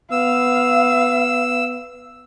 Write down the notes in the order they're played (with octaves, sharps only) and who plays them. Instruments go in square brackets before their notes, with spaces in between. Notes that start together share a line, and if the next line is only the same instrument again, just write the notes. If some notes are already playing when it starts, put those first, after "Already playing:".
[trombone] B3 [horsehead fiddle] F5 [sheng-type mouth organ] E6